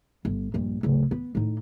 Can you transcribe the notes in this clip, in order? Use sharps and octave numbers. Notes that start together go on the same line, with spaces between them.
G1
A#1 G2
D1 C#3
B3
A2 D#4